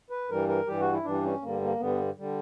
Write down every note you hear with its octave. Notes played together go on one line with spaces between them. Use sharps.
B4
G2 E3 G3 A#4
A#4
G2 E3 G3 G4
F#4
E4
G2 E3 G3 D4
C#4
G2 D3 G3 A#3
A#3
G2 D3 G3 B3
D3 G3